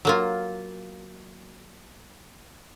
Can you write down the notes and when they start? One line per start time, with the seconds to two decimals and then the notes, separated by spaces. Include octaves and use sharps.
0.05 F#3 A#3 F4